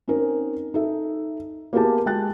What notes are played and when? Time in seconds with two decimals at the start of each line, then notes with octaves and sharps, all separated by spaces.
0.08 C4 C#4 D#4 A#4
0.74 D#4 A4 E5
1.73 A#3 B3 E4 G4 G#4 A5
2.06 G#3 G5 A5 F#6 A6